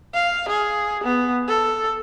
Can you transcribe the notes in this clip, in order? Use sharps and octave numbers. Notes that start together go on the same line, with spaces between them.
F5
G#4
B3
A4